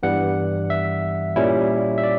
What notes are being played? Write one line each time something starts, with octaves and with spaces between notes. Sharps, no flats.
G2 E3 G3 B3 F#5
E5
A#2 G3 C#4 E4
E5
D5